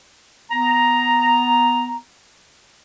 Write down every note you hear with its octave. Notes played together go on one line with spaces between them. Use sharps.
B3 A#5